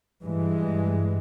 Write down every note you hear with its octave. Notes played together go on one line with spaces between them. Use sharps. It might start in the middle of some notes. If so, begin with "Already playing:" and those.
G2 E3 G#3